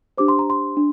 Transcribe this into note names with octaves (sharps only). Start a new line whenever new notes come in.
D4 G4 C5 D6
C6
A#5
C6
D4